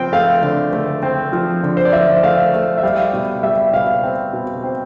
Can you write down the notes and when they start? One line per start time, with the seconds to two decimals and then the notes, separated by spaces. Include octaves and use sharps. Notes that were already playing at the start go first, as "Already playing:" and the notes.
Already playing: F3 C4 G5
0.13 A3 F5
0.43 D3
0.73 A3
1.03 C4
1.33 F3
1.63 D3
1.77 C5
1.85 D5
1.93 F3 E5
2.23 A3 F5
2.53 A3
2.77 E5
2.83 G3 F5
3.13 B2
3.43 G3 E5
3.73 B2 F5
4.03 C4
4.33 B2
4.64 C4